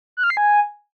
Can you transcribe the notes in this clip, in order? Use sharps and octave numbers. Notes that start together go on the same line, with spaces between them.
F#6
F6
C7
G#5